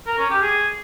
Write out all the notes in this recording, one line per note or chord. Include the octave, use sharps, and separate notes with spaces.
A#4
C#4
G4
G#4